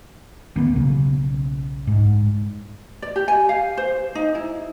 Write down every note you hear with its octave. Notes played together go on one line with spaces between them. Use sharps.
D2 A#3 B3
B1 C#3
G#2
D5
G4
G#5
F5
C5
D#4
E4